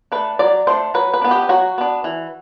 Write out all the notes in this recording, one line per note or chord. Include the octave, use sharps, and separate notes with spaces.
A3 D4 B4
F#3 D5
A3 D4 C5
F#3 B4
B4
B3 D4
G4
F#3 F#4
B3 D4
E3